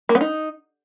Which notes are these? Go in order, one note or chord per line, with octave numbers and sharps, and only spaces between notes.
A#3
B3
D#4